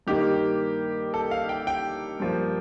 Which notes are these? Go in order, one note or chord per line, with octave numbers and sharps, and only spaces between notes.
G2 D#3 A#3 G4
A4
F5
G5
G5
G2 F3 A#3